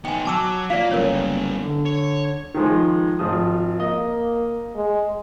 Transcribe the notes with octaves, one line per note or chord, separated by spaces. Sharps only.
B3 D#4 G5 G#5
F#3 A5 D6 E6
A#2 A#3 D5 F5
F#1 G3 B3 A#4 C#5
D3
C#5
D#3 F3 G#3
G#1 F3 D#6
A#3 D#5
G#3